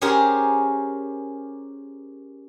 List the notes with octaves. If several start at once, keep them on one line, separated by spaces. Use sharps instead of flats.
C#4 G4 G#4 A#4 C5